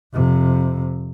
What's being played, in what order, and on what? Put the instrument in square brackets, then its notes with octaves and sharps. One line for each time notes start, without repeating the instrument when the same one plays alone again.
[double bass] F2 C3